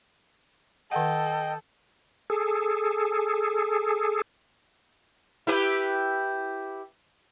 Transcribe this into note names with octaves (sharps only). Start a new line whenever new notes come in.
D#3 A4 D#5 F#5 G5
G#4 A4
E4 G4 B4